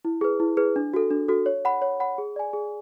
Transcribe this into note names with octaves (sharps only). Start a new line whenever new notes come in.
E4
G#4 B4
E4
G#4 B4
D4
F#4 A4
D4
F#4 A4
C#5
F#5 B5
C#5
F#5 B5
G#4
D5 G#5
G#4